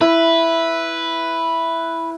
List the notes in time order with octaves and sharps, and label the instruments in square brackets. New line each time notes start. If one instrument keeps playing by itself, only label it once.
[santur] E4 [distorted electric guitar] B4